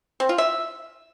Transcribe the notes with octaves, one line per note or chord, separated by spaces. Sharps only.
C4
F4
E5